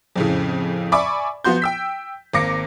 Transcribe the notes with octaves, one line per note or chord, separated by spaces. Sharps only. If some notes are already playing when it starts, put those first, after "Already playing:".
F2 A2 C#3
D5 E5 G#5 B5 C#6 D6
F3 B3 F#4 C6 G6
G5 E6 B6
G#1 A#3 D6 A#6 C#7